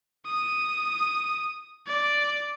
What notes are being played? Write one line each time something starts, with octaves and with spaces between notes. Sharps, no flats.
D#6
D5